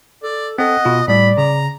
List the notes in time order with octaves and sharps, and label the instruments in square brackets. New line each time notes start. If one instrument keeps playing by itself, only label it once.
[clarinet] A4 [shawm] D5
[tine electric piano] C4 A4 [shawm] D#5 [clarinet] F#5
[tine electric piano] B2 F4
[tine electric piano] A2 G3 [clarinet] D5 [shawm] B5
[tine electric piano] C#3 [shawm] A#5